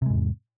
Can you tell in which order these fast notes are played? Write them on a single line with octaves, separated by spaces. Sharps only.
C3 G#3 G#2 E2